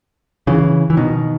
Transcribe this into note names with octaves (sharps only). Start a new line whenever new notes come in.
C#3 E3
E3
B2 D#3